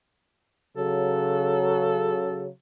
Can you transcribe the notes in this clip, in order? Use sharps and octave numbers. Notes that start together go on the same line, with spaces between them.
C#3 F#3 A4